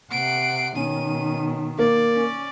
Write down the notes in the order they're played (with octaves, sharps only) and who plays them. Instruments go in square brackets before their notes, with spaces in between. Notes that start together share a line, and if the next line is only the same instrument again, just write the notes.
[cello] C3 F#5 [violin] C7 D7
[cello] B2 D#3 [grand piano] C#4 [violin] D#7
[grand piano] A#3 [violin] D5
[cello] C#4